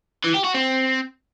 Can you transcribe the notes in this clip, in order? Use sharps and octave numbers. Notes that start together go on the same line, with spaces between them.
E3
G4
F#4
C4